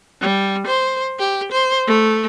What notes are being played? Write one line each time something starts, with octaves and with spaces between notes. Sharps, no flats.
G3
C5
G4
C5
A3